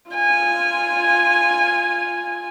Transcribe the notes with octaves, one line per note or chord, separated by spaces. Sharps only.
F4 G#5